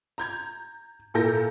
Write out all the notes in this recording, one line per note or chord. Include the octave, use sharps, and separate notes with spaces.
A#5 G6 G#6
A#2 E4 A4 A#4 G6 A#6